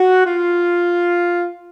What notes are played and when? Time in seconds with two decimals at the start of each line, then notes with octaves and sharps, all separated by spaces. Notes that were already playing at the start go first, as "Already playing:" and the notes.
Already playing: F#4
0.25 F4